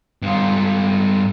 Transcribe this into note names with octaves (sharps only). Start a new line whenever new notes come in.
G2 F4